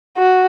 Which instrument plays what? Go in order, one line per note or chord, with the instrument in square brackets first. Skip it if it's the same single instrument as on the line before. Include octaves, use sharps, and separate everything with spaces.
[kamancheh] F#4